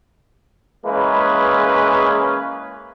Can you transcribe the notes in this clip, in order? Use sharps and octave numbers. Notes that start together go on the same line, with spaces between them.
E3 G#3 A#3 C#4 G#4 B4